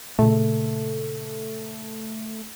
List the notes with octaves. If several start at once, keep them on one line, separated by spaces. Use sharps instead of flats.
A#2 C#3 A3